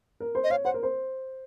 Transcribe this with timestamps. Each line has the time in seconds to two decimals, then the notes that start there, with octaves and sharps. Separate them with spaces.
0.20 A#4
0.35 C5
0.44 D#5
0.50 C#5 F5
0.65 C5 F#5
0.74 A#4
0.83 C5